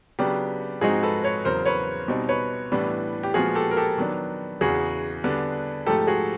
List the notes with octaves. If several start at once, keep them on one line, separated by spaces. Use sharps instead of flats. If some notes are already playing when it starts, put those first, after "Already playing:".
C#3 F#3 B3 D4 G4
G#2 F3 G#3 C4 D#4 F#4 G#4
A4 B4
B4 C#5
E2 C#3 F#3 A#4 C5
B4 C#5
B2 G3 C4 D#4
B4 C#5
A2 E3 G3 B3 D4
G4
A#2 F3 G#3 B3 F#4 G#4
G4 A4
A#4
G4 A4
D#3 F#3 B3 D4
E2 C#3 E3 F#4 G#4
D3 G3 B3 D4
G#2 F3 A3 G4 A4
F#4 G#4